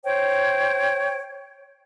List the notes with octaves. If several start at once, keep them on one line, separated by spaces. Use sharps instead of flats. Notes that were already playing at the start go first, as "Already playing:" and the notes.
C5 C#5 G5